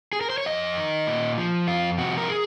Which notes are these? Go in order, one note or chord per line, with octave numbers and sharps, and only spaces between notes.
G#4
A#4
C5
C#5
F2 D#5
D#3
A#2
F3
F2 F4
C3 F3 F#4
A#4
G#4